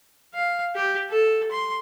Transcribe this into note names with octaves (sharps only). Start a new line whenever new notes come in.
F5
G4
A4
C6